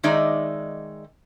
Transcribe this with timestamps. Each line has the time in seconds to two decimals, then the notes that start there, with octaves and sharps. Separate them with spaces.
0.03 D#3 G#3 D#4 D5 E5